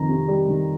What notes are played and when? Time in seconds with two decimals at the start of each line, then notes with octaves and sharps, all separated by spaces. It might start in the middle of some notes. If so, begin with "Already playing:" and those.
Already playing: F2 D#3 A#5
0.09 C3
0.28 G3
0.49 D#3